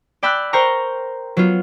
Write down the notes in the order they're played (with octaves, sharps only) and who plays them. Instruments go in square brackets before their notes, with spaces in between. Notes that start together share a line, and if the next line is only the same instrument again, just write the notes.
[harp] D5 G5 B5 E6 F#6
A#4 C5 G5 A#5 C#6
F#3 B3 F4